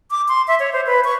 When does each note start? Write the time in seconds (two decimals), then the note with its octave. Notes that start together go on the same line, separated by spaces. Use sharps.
0.11 D6
0.28 C6
0.48 E5
0.60 C#5
0.73 C5
0.86 B4
1.05 C#6